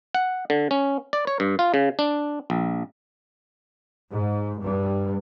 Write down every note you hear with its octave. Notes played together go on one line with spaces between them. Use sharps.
F#5
D3
C#4
D5
C#5
G2
F4
C#3
D4
A#1
G#2
G2